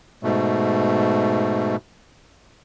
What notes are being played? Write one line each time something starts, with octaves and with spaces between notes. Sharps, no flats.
G#2 B2 A3